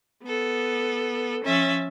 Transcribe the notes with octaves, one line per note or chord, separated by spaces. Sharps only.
B3 A4
F3 C#4 E5 A6